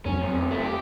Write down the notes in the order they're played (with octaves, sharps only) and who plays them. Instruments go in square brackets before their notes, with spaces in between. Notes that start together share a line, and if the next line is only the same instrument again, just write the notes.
[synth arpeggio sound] F2 F#3 [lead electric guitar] C#4
[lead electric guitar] D2 C3
C#2 A3
G4